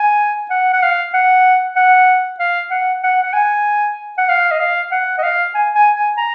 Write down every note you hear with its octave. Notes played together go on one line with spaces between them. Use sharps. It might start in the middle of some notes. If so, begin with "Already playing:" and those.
Already playing: G#5
F#5
F#5
F5
F#5
F#5
F5
F#5
F#5
F#5
G#5
F#5
F5
D#5
F5
F#5
D#5
F5
G#5
G#5
G#5
A#5